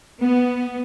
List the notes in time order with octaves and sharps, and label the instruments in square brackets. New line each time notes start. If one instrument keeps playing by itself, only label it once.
[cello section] B3